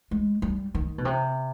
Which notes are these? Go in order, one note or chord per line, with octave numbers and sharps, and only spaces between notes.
G#3
G3
D#3
B2
C3